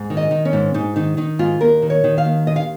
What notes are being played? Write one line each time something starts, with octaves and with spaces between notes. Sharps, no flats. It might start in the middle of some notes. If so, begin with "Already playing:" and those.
Already playing: G#2
D#3
D#5
D#3
C#4
G#2
G#2 D#4
D#3 D#4
D#3 D#4
G#2 F4
D#2 A#4
D#3
C#5
D#3
F5
D#2
D#2 D#5
F5